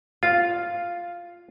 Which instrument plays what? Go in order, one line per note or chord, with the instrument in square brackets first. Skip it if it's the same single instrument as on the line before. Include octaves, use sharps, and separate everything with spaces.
[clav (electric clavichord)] F4 [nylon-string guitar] F5